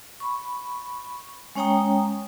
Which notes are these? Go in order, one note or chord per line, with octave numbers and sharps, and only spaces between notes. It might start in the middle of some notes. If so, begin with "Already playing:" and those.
B5 C#6
G#3 C#4 C#5 G5 A#5 D#6